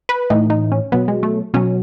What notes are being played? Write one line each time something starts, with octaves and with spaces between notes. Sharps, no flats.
B4
A2 E3 D#4
D#4
C#4
B2 F#3 B3
G#3
A3
B2 F#3 C#4